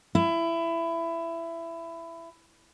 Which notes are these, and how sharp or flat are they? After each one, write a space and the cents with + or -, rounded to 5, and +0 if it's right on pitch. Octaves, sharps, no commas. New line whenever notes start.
E4 +20